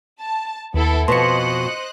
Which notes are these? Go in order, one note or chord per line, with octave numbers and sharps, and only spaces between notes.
A5
D#2 B3 E4 A4
F2 B2 C5 D#5 C6 F#6 C#7